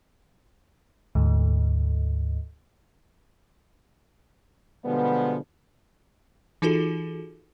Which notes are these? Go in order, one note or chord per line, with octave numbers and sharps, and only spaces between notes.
D2 G#2
B2 D3 F3 G3 G#3 B3
E3 D#4 F4 F#4 G#4 A4